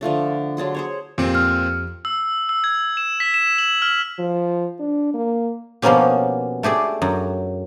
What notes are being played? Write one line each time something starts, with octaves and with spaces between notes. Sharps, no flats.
D3 F3 A3 D4
F#3 D4 G#4 C6
G#4 C5 C#5
F2 A#2 C4 G4
F6
E6
E6
G#6
E7
B6
E7
F#7
F6
F3
D4
A#3
B2 F3 A#3 B3 C#4 G4
A3 G4 G#4 D5
F#2